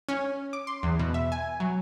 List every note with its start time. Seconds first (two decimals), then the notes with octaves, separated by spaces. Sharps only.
0.09 C#4
0.53 D6
0.67 C6
0.83 E2
0.99 B2
1.14 E5
1.32 G#5
1.60 F#3